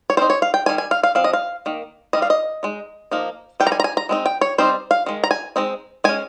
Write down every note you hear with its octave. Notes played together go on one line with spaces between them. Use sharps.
C#5
G3 C4 D#4 C5
C#5
F5
G5
D#3 G3 G#5
G#5
F5
F5
F3 C4 F5
D#5
F5
D#3 A#3
D#3 G3 C4 D#5
F5
D#5
G#3 D#4
F3 A#3 D#4
D#3 G3 G5
A#5
G#5
A#5
G#5
A#5
G#3 C4 D#4
G5
C#5
G3 C4 D#4 C5
F5
D#3 G#3
A#5
G#5
G#3 C4 D#4
G#3 C#4 G#5